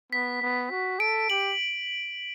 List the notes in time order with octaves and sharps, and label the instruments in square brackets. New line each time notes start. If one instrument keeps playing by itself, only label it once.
[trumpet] B3 [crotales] B6
[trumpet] B3
F#4
[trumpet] A4 [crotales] D7
[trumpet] G4 [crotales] F#7